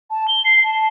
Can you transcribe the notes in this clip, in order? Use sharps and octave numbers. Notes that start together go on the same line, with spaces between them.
A5
G7
C7
A5